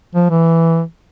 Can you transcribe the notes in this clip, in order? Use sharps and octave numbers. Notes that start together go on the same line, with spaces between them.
F3
E3